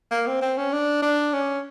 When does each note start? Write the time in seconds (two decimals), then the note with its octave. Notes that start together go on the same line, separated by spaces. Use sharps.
0.11 A#3
0.27 C4
0.41 C4
0.57 C#4
0.73 D4
1.02 D4
1.33 C#4